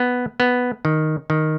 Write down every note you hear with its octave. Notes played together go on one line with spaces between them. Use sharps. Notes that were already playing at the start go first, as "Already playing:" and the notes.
Already playing: B3
B3
D#3
D#3